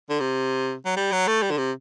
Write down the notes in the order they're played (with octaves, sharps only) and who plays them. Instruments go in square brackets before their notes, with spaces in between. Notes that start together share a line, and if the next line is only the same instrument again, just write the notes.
[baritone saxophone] D3
C3
F#3
G3
F#3
A3
G3
D3
C3